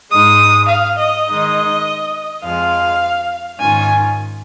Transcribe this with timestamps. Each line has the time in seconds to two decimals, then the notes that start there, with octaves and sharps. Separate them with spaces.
0.11 G#2 G#3 D#4 D#6
0.68 F5
0.98 D#5
1.26 D#3 G#3 D#4
2.42 F2 F3 G#3 F5
3.59 G#2 D#3 C#4 F4 G#5